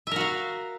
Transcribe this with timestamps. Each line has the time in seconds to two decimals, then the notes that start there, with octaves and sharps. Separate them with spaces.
0.07 E5
0.11 A#4
0.16 F#4
0.21 F5